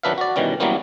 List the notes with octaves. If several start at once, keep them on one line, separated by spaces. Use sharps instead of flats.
D#3 F#3 D4 B4 E5 F5
F#4 D5
B2 D#3 E3 G3 C#4
E3 F#3 G3 A#3 B3 C#4